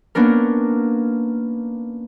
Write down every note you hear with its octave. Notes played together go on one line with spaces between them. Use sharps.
A#3 B3 C#4 D4 A#4